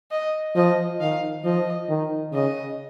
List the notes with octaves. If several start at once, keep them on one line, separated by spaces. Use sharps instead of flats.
D#5
F3 D#5
D#3 F5
F3 D#5
D#3
C#3 D#5